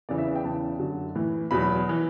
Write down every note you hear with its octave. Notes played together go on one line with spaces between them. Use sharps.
E2 C#3 E3 D5
E5
G5
E2 C#3 E3 A5
F#2 D3 F#3
A2 E3
E2 B2 F#3 B5
E3